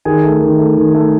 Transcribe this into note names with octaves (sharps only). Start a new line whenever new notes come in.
D#3 G#4 G#5
A3
D#3
A3
D#3
A3